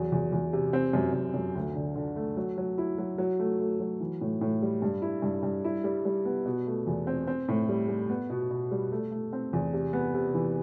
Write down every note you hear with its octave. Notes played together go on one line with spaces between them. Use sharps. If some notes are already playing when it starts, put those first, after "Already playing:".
Already playing: E2 F#3
E2
E2
C3
C4
F#2
F#2
F#2
D2
D3
D3
A3
F#3
F#3
E4
F#3
F#3
A3
A3
F#3
E3
A2
A2
G3
G2
E4
G2
G2
E4
G3
G3
B3
B2
A3
E2
C4
C4
A2
G3
G3
B3
B2
B2
G3
A3
A3
C4
E2
C3
B3
C3
E3